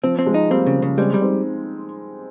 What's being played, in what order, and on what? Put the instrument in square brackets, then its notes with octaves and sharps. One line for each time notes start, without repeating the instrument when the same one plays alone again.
[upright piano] F3 [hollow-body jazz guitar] C4
[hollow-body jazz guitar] C4
[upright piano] F3 G#3
[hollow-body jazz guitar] D#4
[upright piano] G3 A#3 [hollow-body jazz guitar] C4
[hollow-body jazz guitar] C#3
C#3
[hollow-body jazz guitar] G3 [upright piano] G#3 C4
[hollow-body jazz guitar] G3
[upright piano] C4 D#4